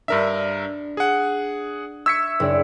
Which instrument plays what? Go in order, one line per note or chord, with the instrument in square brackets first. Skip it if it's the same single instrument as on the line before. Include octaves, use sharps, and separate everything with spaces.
[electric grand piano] G2 A#4 E5 [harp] D4
[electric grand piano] G#4 F#5
[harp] E5 C#6 G#6 [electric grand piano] E6 B6 C#7
[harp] F#1 D4 D5